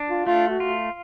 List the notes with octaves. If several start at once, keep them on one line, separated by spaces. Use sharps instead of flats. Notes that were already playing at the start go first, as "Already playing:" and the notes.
Already playing: D4
F4
A3 F4
F#4
F4